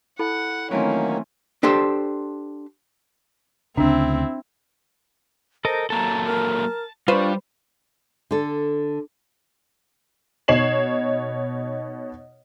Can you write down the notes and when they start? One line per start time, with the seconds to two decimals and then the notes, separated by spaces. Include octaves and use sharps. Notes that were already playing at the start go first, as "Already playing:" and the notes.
0.19 E4 A4 F#5 B5
0.71 D#3 E3 F#3 A3 A#3 C4 C#4
1.63 D4 G4 A4 C5
3.77 D2 C#3 C4 D4 E4
5.65 A4 A#4 C5 D#5
5.90 F#3 A#3 A4 A5 A#5
6.25 A#4
7.08 G3 D4 F4 B4 C5 C#6
8.31 D3 A4
10.48 B2 D#4 C#5 C7 E7 F#7